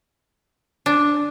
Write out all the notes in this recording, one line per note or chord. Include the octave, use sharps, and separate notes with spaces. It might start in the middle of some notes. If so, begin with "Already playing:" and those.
D4